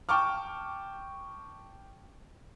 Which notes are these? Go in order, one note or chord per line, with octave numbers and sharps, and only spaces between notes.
G5 A5 C#6 D6 F6